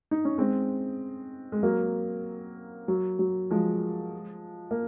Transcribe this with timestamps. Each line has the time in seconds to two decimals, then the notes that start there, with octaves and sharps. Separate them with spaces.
0.11 D#4
0.25 C#4
0.38 G#3 C4
1.52 G#3
1.63 F#3 A#3
2.88 F#3
3.19 F#3
3.51 F3 G#3
4.71 A#3